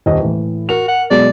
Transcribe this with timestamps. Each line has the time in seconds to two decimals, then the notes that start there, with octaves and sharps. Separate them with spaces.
0.06 D#1 D#5
0.20 A2 E3
0.69 F#4 A#4 F7
0.88 F#5
1.11 B2 F#3 G#3 D5